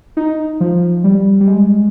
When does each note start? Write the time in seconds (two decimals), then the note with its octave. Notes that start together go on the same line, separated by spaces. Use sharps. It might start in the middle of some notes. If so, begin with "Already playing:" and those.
0.17 D#4
0.61 F3
1.04 G3
1.41 G3
1.47 G#3